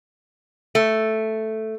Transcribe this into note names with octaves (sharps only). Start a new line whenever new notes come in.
A3